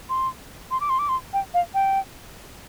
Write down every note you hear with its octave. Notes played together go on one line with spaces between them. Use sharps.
C6
C6
D6
C6
D6
C6
G5
F5
G5